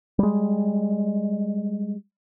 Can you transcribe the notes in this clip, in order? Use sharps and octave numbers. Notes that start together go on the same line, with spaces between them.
G3 G#3